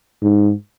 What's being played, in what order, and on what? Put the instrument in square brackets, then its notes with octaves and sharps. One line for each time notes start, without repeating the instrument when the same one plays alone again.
[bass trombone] G#2